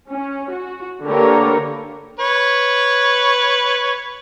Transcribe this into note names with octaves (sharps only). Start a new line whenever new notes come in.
C#4
F#4
D3 A#3 G4 A#4 B4 C#5
B4 C#5